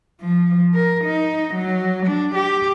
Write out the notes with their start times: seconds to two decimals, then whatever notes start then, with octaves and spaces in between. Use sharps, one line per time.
0.21 F3
0.74 A#4
1.04 D#4
1.54 F#3
2.06 D4
2.35 G4